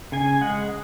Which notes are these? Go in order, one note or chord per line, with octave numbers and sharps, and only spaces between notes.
C#3 G#5
G#3 F#5